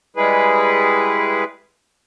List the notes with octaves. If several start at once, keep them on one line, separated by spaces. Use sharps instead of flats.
G3 G#3 E4 G#4 B4